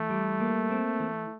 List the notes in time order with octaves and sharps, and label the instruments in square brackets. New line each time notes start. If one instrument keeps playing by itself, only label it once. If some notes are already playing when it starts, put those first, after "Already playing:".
Already playing: [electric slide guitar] E3 [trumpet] A3
[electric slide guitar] G3
A#3
C4
E3